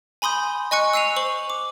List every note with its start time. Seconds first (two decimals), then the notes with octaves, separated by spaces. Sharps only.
0.22 G#5 B5 C6 D#6 G6
0.71 D#5 G#5 C#6 F#6 C#7
0.93 E6 F#6 C7 D#7 F7
1.16 C5 C#6 F#7
1.50 D6